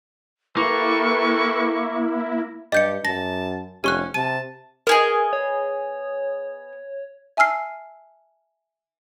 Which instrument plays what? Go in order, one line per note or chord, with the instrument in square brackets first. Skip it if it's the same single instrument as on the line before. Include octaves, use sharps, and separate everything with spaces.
[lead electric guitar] A#3 [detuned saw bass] E4 [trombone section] G4 A4 B4 [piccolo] C#6
[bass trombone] G2 [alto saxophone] G4 [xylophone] D#5 G6 C#7
[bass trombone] F#2 [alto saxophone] A5 [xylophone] A#6
[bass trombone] F1 [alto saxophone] C#4 [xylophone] G4 C#6 F#6
[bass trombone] C3 [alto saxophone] A5 [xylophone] D#7
[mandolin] B3 G#4 D#5 [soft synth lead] A#4
[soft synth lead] C#5
[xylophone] E5 G#5 A5 E6 F6 C7